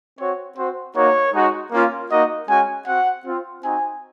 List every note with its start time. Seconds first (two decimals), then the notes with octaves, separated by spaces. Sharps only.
0.19 C4 F#4 C#5
0.57 C4 F#4 C5
0.96 A#3 D#4 F#4 C#5
1.34 G#3 D#4 F#4
1.72 A#3 C#4 F4
2.10 A#3 D#4 F#4 D#5
2.48 G#3 C#4 F#4 G#5
2.87 C4 F#4 F#5
3.25 C4 F4
3.63 C4 D#4 F#4 G#5